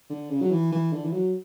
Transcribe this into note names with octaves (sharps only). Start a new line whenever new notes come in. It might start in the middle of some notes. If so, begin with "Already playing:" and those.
D3
C#3
F#3
E3
E3
D3
E3
F#3